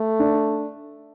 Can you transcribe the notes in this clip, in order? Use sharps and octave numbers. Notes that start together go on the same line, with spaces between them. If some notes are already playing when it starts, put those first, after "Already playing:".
Already playing: A3
D4